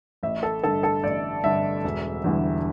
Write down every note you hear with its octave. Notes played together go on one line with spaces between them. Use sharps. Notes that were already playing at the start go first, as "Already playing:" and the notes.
A1 E5
A4
G2 D3 A4
A4
A1 D5
G2 D3 E5
E1
E2 D3 G3